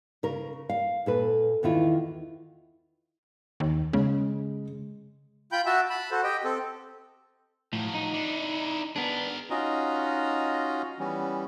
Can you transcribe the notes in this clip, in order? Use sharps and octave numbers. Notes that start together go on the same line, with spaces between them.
C#3 A#4
F5
A#2 A4 B4
E2 D#3 E4 F4
D#2
C#3 G#3
F4 G5 B5 G6
F#4 E5 A5
A5 B5
F#4 A4 C5
G4 D#5 G5
C4 A4
A2 F3 F#3
D#4
D4 E4
B3 D4 G#4 A#4
C#4 D#4 F4 F#4 D#5 A#5
E3 G3 B3 C#4